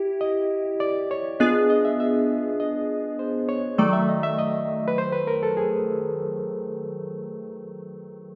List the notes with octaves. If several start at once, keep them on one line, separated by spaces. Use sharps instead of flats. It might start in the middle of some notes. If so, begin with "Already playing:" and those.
Already playing: E4 G4
D#5
D5
C#5
B3 D4 F4 G#4 D#5
D#5
E5
E5
D#5
C5
C#5
D#3 F#3 A3 D5
E5
D#5
E5
D#5
B4
C5
B4
A#4
A4
G#4